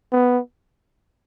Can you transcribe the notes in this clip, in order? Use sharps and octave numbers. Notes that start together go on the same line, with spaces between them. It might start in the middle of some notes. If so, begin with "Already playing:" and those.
B3